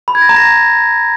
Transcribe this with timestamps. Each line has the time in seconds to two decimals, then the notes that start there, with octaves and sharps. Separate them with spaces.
0.08 B5
0.15 G#6
0.22 A#6
0.29 A#5
0.36 A#6